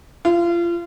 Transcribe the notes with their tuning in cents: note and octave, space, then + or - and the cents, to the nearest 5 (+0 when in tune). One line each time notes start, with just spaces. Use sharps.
F4 -30